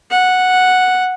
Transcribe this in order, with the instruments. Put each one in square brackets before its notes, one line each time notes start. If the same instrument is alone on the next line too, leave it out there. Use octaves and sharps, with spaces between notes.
[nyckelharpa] F#5